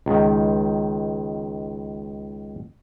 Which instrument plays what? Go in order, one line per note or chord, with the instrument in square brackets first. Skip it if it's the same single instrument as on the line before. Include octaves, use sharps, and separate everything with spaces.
[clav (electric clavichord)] C#2 D#3